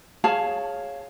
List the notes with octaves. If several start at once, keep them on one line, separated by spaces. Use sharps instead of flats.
G#4 C#5 F5 A5